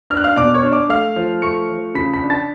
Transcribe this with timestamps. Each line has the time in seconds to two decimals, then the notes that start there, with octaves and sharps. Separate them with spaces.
0.10 D4 F6
0.17 F#6
0.24 F5 F6
0.36 B2 D5 D6
0.54 C#5 C#6
0.63 D4
0.72 D5 D6
0.89 A3 F5 F6
1.16 F3
1.42 A3 C#6 C#7
1.69 F3
1.95 C#3 B5 B6
2.13 B5 B6
2.22 D4
2.30 A5 A6